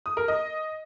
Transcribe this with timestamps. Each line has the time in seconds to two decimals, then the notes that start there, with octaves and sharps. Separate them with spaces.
0.06 D#6
0.17 A#4
0.28 D#5